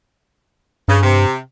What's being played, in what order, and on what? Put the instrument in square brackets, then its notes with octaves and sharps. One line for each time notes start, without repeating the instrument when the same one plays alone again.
[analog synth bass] G2 [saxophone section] C#3
[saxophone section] C3